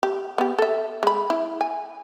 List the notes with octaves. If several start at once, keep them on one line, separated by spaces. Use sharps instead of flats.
G4
B3 G4
A4 E5
G#3 B5
E4
G#5